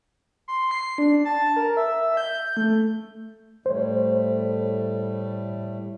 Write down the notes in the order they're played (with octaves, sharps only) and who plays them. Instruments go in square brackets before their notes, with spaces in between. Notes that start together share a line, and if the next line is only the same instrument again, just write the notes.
[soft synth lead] C6
C7
D4
A5
A#4
E5
G6
A3
[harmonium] A2 G3 A3 [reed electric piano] C5 C#5